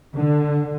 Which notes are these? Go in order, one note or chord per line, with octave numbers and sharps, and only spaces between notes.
D3